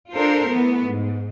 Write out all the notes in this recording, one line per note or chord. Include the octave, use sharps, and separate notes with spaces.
D4 F4 A4 A#4 C5
E3 A3 B3
G#2